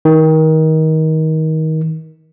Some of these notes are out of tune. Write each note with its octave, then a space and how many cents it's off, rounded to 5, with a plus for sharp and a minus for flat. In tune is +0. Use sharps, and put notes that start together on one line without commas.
D#3 +25